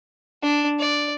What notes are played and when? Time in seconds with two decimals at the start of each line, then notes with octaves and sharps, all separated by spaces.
0.43 D4
0.80 D5